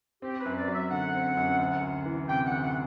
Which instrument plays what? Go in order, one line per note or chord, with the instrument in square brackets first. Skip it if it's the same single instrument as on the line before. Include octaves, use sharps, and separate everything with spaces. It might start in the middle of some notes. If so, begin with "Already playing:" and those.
[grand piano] C4 [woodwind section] G4
[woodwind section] B4
[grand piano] F#2
[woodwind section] D5
[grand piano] F#3
[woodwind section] E5
[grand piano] D3 [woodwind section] F#5
[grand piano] C4
F#2
D2
D2
E3
[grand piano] C3 [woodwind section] G5
[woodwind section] F#5
[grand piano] D2
[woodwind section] F#5